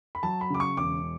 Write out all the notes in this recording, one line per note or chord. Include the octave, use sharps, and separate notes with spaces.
B5
F#3 A5
B5
C#3 D6
C#6
E1 D6